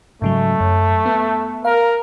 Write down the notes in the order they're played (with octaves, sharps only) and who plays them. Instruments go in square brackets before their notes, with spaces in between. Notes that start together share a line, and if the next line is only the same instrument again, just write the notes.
[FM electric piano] G#2 C#3 F#3 [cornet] A3
[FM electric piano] F#2
B3
[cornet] A#4 [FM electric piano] F5